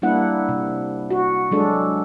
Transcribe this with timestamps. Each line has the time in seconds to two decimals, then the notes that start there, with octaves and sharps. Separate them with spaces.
0.02 G3 A#3 D4 E4 F#5
0.49 C3
1.10 F#4
1.51 F#3 G#3 D4 A4